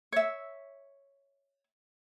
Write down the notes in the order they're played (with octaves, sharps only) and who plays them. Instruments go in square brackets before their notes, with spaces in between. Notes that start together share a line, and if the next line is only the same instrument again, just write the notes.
[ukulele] C#5 E5